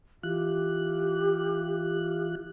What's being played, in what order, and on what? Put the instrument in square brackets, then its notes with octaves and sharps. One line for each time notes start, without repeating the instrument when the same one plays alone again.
[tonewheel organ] E3 F4 F#6 [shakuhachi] G4